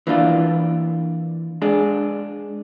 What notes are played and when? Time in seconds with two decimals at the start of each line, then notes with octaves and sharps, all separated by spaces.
0.07 E3 A#3 D4 F4
1.62 G#3 D4 G#4